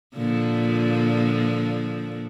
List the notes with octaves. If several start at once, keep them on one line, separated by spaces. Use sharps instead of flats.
A#2 D3 F3